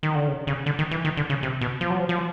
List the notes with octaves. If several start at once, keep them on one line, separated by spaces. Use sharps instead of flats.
D#3
D3
C#3
C#3
D3
D#3
E3
D#3
D3
C#3
C3
B2
F3
F#3
F3
F3